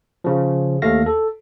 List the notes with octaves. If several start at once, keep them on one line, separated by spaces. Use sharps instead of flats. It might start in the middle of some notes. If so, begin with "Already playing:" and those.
C#3 F3
D#2 A3 F5 A#6
A4